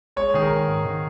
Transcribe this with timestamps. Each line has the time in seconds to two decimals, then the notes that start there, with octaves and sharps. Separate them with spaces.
0.16 G#3 C#5
0.34 D#3 G#4
0.42 A#4
0.51 D#3
0.68 G#2
0.85 D#3